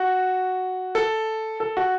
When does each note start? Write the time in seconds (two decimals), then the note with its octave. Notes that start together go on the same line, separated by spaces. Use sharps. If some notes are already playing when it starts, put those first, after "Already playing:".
Already playing: F#4
0.95 A4
1.60 A4
1.77 F#4